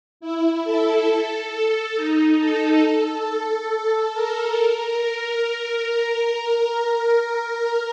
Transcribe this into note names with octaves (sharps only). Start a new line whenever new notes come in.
E4
A4
D#4
A4
A4
A#4
A#4